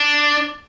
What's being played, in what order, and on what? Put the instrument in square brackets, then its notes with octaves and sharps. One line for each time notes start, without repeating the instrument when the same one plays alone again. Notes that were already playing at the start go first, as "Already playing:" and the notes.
Already playing: [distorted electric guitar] D4